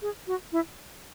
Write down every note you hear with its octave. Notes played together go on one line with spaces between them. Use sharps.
G#4
F#4
E4